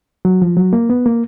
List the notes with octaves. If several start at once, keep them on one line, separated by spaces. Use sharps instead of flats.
F#3
F3
F#3
A#3
B3
A#3